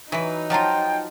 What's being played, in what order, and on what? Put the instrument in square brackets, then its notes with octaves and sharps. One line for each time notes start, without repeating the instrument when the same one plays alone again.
[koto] E3 [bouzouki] F#3 B4 [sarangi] D#4
[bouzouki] F3 A5 A#5 [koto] F#3 F4 [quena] G5